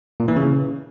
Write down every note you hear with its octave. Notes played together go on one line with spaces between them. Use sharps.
A#2
E3
C#3